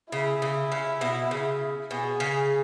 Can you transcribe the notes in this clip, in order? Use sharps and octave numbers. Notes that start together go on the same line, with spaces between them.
C#3 E4
C#3
C#3
B2
C#3
B2 G#4
C#3